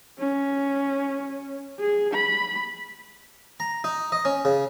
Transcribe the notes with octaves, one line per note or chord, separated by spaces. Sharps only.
C#4
G#4
B5
A#5
D#4
D#5
C#4
C#3